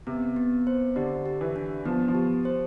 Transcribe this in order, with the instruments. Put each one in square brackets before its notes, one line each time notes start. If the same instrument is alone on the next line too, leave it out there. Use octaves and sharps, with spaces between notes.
[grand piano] C3 [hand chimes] B3
[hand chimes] B3
C5
[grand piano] D3 [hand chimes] G4
[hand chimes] G4
[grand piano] E3
[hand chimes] D4
[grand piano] F3 [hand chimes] B3
[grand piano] F3
[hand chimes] G4
C5